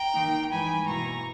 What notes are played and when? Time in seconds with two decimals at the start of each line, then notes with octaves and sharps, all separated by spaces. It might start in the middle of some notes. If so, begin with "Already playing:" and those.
Already playing: G5 A#5
0.13 D#3 A#3 D#4
0.50 G2 E3 G#3 D#4 G#5 B5
0.86 B2 A#3 E4 A#5 C#6